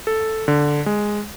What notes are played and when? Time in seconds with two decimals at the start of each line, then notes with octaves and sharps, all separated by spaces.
0.07 A4
0.48 D3
0.86 G#3